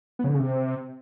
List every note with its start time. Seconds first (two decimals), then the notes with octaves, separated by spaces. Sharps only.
0.19 B3
0.24 C#3
0.29 D3
0.34 C#3
0.39 C3